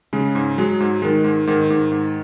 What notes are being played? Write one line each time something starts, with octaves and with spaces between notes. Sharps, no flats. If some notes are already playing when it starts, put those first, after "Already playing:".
C#3 G#3
G#2
F#3 G#3
G#2
D#3 G#3
G#2
G#2 D#3
G#2
G#2